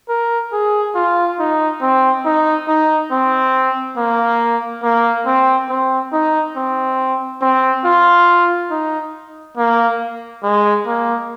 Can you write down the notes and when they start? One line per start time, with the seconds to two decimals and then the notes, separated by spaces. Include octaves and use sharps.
0.09 A#4
0.52 G#4
0.95 F4
1.39 D#4
1.82 C4
2.25 D#4
2.68 D#4
3.12 C4
3.97 A#3
4.83 A#3
5.26 C4
5.69 C4
6.13 D#4
6.56 C4
7.42 C4
7.84 F4
8.71 D#4
9.57 A#3
10.43 G#3
10.87 A#3